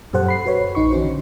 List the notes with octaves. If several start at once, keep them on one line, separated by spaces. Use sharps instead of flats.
F#2 A#2 G4 A4 C5 F#5
B5 C7
F#4 B4 C#5
A#1 D#4 C#6
D#3 C#4 F#4 C5
D3